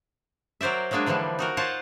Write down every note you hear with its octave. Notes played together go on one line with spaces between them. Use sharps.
F#3 A#4 C5 D5 E5
F#3 G#3 A#3 D4 G#4
D3 E3 F3 G3 D4
D#4 F#4 A#4
F4 C5 C#5 F#5 A5